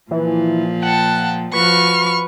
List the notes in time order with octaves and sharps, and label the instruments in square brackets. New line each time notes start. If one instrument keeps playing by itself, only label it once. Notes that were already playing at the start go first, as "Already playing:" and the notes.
[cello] A#2 F3 [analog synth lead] E3
[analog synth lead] F#5 [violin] G5 A5
[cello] F3 F#4 [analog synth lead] B4 [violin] C#6 F6